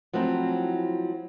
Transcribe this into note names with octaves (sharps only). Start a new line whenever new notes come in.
F3 F#3 A3 C4 E4